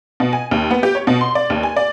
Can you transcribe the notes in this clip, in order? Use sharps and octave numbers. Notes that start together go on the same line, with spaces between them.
B2
G#5
D#2
B3
G4
C#5
B2
C6
D5
D#2
G#5
D5